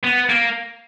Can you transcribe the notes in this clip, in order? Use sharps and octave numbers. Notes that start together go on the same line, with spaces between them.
B3
A#3